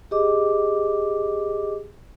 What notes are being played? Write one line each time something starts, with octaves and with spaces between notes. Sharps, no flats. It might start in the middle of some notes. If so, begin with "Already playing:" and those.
G4 G#4 D#5 D6